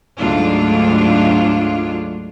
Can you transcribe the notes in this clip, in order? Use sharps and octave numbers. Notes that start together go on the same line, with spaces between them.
D2 G#2 F#3 D4 F4